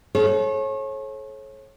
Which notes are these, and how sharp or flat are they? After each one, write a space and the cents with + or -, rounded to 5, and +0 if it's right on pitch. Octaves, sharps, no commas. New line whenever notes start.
A4 -40 C#5 -35